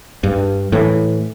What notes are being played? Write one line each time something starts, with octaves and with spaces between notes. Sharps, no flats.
G2
A2 E3